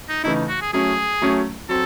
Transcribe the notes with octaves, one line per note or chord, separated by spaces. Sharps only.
D#4
C#3 E3 A3 D#4 E4
F#4
G#4
F#3 A3 C#4 G#4
F#3 A3 C#4
F#3 C4 A4